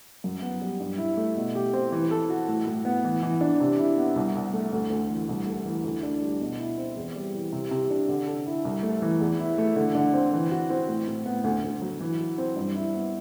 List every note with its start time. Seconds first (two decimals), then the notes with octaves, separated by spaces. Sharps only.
0.24 F#2
0.42 B3
0.62 G3
0.80 G2
0.98 E4
1.17 A3
1.35 B2
1.55 G4
1.73 C4
1.92 E3
2.11 A4
2.29 F#4
2.48 A2
2.67 A2
2.85 B3
3.04 E3
3.22 E3
3.41 D4
3.60 C3
3.79 E4
3.97 B3
4.16 C2
4.35 C2
4.53 A3
4.73 D2
4.90 D2
5.09 E3
5.29 C2
5.47 A3
5.65 E3
5.84 D2
6.03 D4
6.22 G3
6.40 B2
6.59 E4
6.78 C4
6.97 E2
7.16 G3
7.34 E3
7.52 C3
7.71 C3
7.90 D4
8.09 D3
8.27 A4
8.46 E4
8.65 C2
8.83 A3
9.02 E3
9.20 E2
9.39 E4
9.58 A3
9.76 D3
9.95 D3
10.13 C4
10.33 E3
10.51 F#4
10.70 C4
10.89 A2
11.08 A2
11.26 B3
11.44 D2
11.64 D2
11.82 F#3
12.00 E3
12.20 F#4
12.38 C4
12.57 G2
12.76 E4
12.95 B3